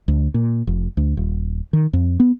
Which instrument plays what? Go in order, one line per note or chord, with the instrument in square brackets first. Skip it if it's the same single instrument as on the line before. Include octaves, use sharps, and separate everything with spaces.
[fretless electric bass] D2
A#2
F1
D2
D#1
D#3
F2
B3